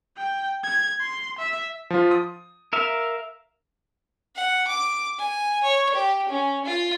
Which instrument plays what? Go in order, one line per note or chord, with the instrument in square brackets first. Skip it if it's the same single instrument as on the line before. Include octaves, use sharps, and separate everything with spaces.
[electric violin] G5
G#6
C6
E5
[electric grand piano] F3 F4
D#6
[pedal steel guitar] A#4 E5 F5
[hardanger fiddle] F#5
D6
G#5
C#5
G4
C#4
F4